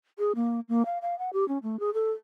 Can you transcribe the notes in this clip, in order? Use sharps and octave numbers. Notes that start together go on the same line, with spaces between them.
G#4
A#3
A#3
F5
F5
F#5
G4
C#4
A3
G#4
A4